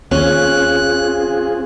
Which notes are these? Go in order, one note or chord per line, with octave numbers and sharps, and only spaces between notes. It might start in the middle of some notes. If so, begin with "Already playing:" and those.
D#2 C4 C#4 F4 G#4 F#6